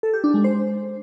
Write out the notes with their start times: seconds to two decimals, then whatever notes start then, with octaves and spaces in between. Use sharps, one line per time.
0.03 A4
0.13 G4
0.24 D4
0.34 G#3
0.44 C5